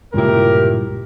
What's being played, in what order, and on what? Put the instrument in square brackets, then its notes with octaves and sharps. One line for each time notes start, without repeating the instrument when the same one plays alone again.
[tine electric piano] C#2 A#2 [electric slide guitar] G2 E4 [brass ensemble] G4 A#4